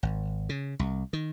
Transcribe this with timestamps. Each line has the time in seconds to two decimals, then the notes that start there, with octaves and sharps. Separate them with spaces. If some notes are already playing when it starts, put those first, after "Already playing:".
0.03 G#1
0.49 C#3
0.79 C2
1.13 D#3